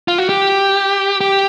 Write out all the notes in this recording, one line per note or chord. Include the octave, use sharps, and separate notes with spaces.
F4
F#4
G4
G4